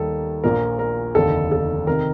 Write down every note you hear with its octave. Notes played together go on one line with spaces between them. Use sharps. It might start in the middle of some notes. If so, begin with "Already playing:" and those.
Already playing: D#2 D#3 G3 A4
A#1 A#2 F3 A#4
A#4
F1 D#2 D3 A4
A4
C3 D#3 A#4